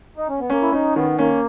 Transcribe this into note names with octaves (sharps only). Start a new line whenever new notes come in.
D#4
C#4
B3
A#3 C#4
E4
C#4 D#4
D#3 B3
A#3 C#4